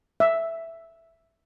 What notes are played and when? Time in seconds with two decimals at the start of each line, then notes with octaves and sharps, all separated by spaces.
0.20 E5